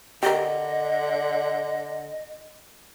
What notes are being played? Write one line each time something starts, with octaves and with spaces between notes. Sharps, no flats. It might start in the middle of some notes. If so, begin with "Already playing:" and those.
D3 G4 A#4 D#5